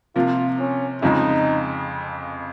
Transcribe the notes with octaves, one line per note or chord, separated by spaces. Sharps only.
C3 F3 A#3 F4
C#4
F2 C#3 F3 G#3 D#4